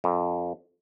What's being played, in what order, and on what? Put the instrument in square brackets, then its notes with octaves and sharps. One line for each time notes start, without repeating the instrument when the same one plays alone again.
[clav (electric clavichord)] F2